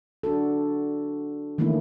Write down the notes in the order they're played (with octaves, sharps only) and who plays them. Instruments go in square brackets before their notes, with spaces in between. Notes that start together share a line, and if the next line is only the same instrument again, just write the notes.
[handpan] D4 F#4 A4
D#3 E3 A3 A#3 C#4 E4